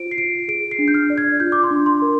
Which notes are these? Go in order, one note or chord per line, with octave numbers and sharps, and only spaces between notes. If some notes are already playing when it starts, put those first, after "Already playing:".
Already playing: F4 C5 D7
C7
F4 D7
G#4 D7
C7
D4
G6
F6
D5
G#6
F4 G6
D6
C6
D4
C6
A#4